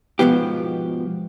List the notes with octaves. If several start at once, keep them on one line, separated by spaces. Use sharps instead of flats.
G#2 B2 E3 F3 B3 G4